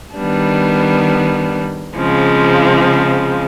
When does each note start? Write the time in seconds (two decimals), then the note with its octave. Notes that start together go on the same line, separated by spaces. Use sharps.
0.16 D#3 G3 B3 D4
1.97 C#3 F3 G#3 C4